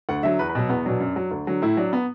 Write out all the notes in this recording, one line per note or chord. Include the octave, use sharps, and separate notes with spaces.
D2 F#5
D3 F#3 E5
E2 B4
B4
B2 F#3
E2 B3
B2 F#3 D4
F#2
F#3
D2
D3 F#3
A2 E4
F#3 D4
B3